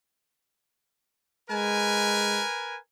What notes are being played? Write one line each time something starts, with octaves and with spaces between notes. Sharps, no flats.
G#3 A#4 B4 G#5